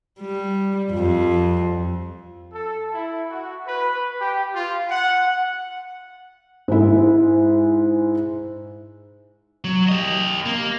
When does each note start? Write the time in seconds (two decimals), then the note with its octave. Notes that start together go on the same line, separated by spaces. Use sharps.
0.21 G3
0.91 F2
2.52 A4
2.92 E4
3.30 F#4
3.66 B4
4.21 G4
4.53 F4
4.89 F#5
6.68 G#2 E4
9.64 F#3
9.89 G4 D#5
10.46 A#3